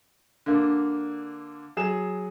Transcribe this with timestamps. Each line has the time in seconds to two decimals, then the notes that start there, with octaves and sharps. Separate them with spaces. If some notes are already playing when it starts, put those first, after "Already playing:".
0.46 D3 A#3
1.77 F#3 G#4 E7